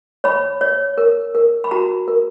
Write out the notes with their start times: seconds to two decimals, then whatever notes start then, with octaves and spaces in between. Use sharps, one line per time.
0.24 C#5 B5
0.61 C#5
0.98 A#4
1.35 A#4
1.64 B5
1.71 F#4 A#5
2.08 A#4